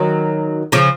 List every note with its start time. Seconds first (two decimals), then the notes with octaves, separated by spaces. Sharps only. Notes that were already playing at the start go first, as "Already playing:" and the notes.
Already playing: D#3 F#3
0.72 C#3 F3